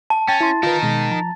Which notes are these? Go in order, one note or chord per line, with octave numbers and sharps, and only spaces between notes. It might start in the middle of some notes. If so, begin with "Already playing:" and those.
A5
C#4 G5 A6
E4 C6
D#4 F4 A#4 B4
B2 D#3 G#3
F3 A#5